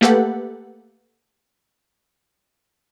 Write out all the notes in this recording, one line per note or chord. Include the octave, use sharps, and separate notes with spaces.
A3 A#3 G4 A4 B4 F#5